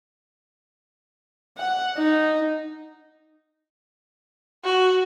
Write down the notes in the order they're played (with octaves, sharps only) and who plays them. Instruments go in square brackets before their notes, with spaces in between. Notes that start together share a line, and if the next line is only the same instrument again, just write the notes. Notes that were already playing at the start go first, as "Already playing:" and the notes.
[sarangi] F#5
D#4
[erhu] F#4